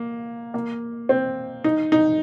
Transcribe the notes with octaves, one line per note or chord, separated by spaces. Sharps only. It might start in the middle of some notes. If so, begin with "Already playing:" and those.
Already playing: A#3
A#3
C4
D#4
D#4